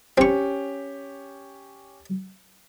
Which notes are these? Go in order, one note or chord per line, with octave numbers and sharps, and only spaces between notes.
C4 C#4 G4 C#6